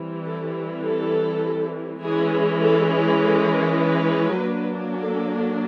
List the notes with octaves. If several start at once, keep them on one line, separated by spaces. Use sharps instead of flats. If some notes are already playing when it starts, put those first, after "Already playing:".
Already playing: E3 G3 C4
A4
A4
E3 G#3 C#4 G#4
A4
G#4
A4
A#4
B4
F#3 A#3 D4
A4